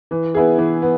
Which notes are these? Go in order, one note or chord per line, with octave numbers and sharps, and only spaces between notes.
E3
B3 E4 G#4
E3
B3